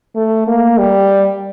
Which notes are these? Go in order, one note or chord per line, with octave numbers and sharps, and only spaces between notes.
A3
A#3
G3